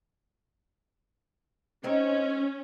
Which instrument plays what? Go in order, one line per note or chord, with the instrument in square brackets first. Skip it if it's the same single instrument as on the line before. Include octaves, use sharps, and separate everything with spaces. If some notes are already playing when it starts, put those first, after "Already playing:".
[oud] G#3 C4 D#4 [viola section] C#4